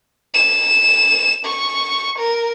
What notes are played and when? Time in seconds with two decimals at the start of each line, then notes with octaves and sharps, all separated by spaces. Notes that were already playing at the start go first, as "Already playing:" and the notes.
0.34 E7
1.45 C#6
2.19 A#4